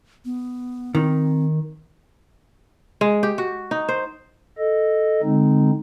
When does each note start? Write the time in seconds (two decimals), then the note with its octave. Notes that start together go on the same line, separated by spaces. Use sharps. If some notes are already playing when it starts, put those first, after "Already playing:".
0.25 B3
0.95 D#3 C4
3.01 G#3
3.23 G4
3.38 F#4
3.71 D#4
3.89 C5
4.58 A4 D#5
5.22 D3 G#3 C4 D#4